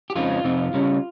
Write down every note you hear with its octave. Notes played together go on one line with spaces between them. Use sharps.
G4
F2 C#3 G#3 C4 D#4 F4
F2 C3 F3 C4 D#4
C#3 G3 C#4